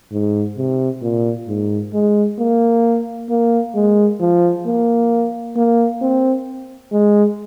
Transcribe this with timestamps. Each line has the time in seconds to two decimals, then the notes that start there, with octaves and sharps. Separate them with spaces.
0.12 G#2
0.58 C3
1.02 A#2
1.48 G#2
1.93 G#3
2.39 A#3
3.29 A#3
3.75 G#3
4.20 F3
4.66 A#3
5.56 A#3
6.01 C4
6.92 G#3